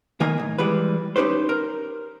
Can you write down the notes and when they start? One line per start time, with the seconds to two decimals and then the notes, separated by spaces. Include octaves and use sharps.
0.20 B1 D#3 A#3 A#4 D#5 G#5
0.39 A2
0.58 E3 G3 G#3 B4
1.16 C#4 D#4 G4 B4 C5
1.49 A#4